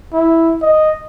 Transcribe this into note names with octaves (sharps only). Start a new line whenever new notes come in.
E4
D#5